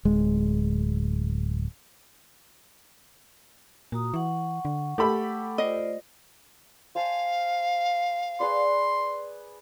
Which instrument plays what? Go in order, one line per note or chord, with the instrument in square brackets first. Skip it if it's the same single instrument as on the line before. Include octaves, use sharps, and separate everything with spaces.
[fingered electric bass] D1 G#3
[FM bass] A#2 [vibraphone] F#4 A#5 D#6
[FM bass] E3 [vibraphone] F#5 C#6
[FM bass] D3
[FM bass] A3 [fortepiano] G4 A4 B5
[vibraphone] F4 C5 D5 [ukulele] D#5
[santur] C5 G#5 A5 [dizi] F5
[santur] G#4 B4 D5 [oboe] C6